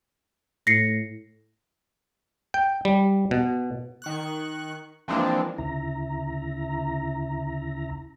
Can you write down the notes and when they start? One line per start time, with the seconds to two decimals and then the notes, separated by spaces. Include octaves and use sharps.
0.67 A2 A#6 C7 C#7
2.54 G5
2.85 G3
3.31 B2
4.02 D#3 C#6 F#6
5.08 E3 F3 G#3 A#3 C4 D4
5.58 D2 C#3 E4 A#5